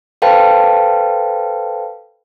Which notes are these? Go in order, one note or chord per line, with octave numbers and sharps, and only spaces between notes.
A4 B4 C5 F5 G5 A5